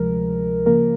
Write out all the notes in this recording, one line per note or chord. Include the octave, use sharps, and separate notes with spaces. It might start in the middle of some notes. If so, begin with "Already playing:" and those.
Already playing: D2 C3 F3 G#3 A#4
C#3 F3 A#3 A#4